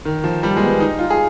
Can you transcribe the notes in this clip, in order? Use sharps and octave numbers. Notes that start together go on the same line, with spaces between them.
D#3
F3
G3
G#3
B3
D#4
F4
G#4